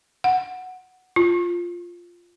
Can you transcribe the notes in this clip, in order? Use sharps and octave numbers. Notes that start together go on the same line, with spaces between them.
F#5
F4